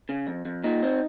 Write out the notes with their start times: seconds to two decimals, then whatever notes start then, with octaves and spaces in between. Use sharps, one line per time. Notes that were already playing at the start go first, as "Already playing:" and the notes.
0.09 C#3
0.27 F2
0.45 F2
0.64 A#2 D#4
0.83 C4